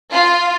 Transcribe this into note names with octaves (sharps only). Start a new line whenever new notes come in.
F4